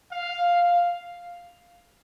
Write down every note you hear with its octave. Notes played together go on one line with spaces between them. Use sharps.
F5